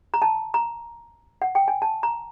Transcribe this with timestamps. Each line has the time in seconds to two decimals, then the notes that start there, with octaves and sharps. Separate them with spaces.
0.14 A#5
0.22 A5
0.54 A#5
1.42 F#5
1.55 G5
1.68 G#5
1.82 A5
2.03 A#5